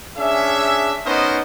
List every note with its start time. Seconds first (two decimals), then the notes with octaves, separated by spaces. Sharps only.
0.17 C#4 D4 G#4 E5
1.05 B3 C#4 D#4 A#4 C5 D#5